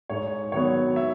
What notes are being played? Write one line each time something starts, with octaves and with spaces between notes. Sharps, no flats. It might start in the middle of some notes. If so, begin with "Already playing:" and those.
G#2 C#5
D#3 F#3 B3 C#5
E5